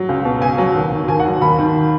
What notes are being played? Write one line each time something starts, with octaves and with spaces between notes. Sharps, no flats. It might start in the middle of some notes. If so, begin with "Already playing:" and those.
Already playing: F#3
C#2
B2
C#2 G#5
F#3
D#2
D#3
D#2 G#5
F#5
F#3
D#2 B5
D#3